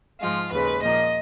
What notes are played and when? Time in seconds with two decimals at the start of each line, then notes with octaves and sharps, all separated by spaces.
0.20 G#2 F3 G#3 F4
0.51 D#2 C#3 G#3 B4
0.82 A#2 F3 A#3 D#5